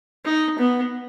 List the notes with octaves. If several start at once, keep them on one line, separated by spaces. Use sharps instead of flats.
D#4
B3